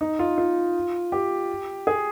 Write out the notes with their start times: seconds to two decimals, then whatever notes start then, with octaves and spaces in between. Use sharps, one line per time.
0.01 D#4
0.19 F4
0.38 F4
1.12 G4
1.87 G#4